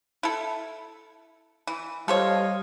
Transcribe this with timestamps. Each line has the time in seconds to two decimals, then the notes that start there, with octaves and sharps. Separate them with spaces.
0.23 E4 A4
1.67 E3
2.08 G3 A4 C5 C#5 D#5 F5